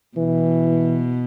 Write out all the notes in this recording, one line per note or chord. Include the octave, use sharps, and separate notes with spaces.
B2 E3